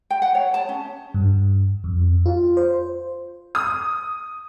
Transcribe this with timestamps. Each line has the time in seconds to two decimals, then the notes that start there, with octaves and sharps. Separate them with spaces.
0.10 G5
0.22 F#5
0.35 C#5
0.54 A5
0.69 C#4
1.14 G2
1.84 F2
2.26 F4
2.57 C5
3.55 D#6